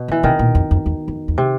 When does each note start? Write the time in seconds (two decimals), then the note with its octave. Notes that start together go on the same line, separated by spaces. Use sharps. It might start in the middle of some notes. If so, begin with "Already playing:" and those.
Already playing: B2
0.08 D3
0.12 E3
0.23 C3 D#3
0.39 A#2
0.55 F2
0.71 F2
0.86 E2
1.08 F2
1.28 E2
1.38 C3